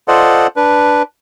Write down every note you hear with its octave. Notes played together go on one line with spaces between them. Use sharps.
F4 A4 C5 D5 D#5 F#5
D4 B4